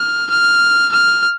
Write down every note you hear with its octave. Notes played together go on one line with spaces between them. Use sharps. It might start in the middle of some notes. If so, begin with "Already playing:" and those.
Already playing: F6
F6
F6